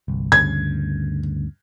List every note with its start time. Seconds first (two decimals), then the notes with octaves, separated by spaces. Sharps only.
0.08 G1 C2
0.32 D2 G2 C#3 G#6